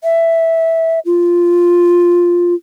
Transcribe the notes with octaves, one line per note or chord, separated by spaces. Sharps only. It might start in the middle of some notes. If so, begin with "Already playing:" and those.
E5
F4